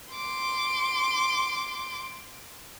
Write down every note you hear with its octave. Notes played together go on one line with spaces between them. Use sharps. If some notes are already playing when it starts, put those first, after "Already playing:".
C6 D6